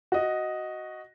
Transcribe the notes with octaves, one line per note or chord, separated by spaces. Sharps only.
F#4 D#5